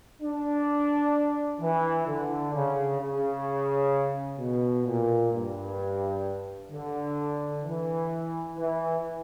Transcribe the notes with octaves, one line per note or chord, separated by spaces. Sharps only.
D4
E3
D3
C#3
C#3
B2
A#2
G2
D3
E3
E3